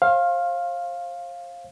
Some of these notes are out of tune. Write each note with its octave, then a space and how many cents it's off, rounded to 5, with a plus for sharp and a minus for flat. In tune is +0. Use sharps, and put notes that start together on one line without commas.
C5 +40 F5 +0